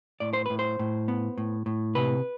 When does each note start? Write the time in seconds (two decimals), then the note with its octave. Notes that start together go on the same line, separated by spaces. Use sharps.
0.20 A2 D5
0.33 C5
0.46 A2 B4
0.59 C5
0.79 A2
1.08 B3
1.38 A2
1.66 A2
1.95 C3 B4